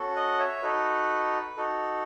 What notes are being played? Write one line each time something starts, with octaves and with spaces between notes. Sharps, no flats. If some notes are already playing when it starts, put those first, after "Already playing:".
Already playing: C#4 F#4 A4
D#5 F#5
C#5 E5
D#4 F#4 A4 B4
D#4 F#4 A4